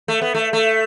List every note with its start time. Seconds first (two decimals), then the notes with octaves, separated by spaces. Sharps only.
0.08 A3
0.21 B3
0.34 A3
0.53 A3